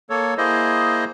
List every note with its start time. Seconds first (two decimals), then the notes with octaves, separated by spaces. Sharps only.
0.10 A#3 A4 C#5
0.38 A#3 E4 G#4 C5 D#5